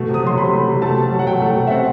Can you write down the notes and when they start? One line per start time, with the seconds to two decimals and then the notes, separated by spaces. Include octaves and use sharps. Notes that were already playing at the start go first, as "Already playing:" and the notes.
Already playing: B2 A3
0.09 C3 D#6
0.23 F#3 C6
0.38 C3 B5
0.53 A3
0.68 C3
0.82 A3 A5
0.97 B2
1.12 F#3
1.19 F#5
1.27 B2 G5
1.42 A3
1.56 B2
1.67 E5
1.71 C4 F#5